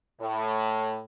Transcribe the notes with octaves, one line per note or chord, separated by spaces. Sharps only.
A2